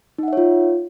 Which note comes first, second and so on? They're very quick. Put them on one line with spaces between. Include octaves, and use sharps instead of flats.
D#4 F#5 E5 C#5 F4